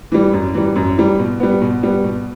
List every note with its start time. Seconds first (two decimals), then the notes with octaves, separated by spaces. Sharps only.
0.12 E3 G3
0.33 F#2
0.54 E3 G3
0.76 F#2
0.97 E3 G3
1.19 B2
1.40 G3 B3
1.61 B2
1.83 G3 B3
2.04 B2